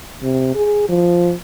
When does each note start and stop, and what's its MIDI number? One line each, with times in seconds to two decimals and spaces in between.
0.23 0.52 48
0.55 0.86 68
0.89 1.34 53